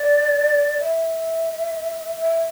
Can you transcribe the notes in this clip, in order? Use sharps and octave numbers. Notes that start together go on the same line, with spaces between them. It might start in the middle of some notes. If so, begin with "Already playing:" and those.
Already playing: D5
E5
E5